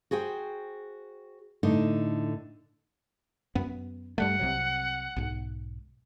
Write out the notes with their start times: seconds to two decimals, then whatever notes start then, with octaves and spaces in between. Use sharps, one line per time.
0.11 F#4 G#4 C5 G5
1.63 A2 D3 D#4
3.55 F#2 B3
4.18 G2 G3 A3 F#5
4.39 C2 C3 F#3
5.16 B1 G#2